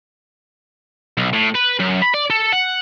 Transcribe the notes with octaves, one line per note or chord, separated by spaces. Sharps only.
B1
A2
B4
F#2
B5
D5
A4
F#5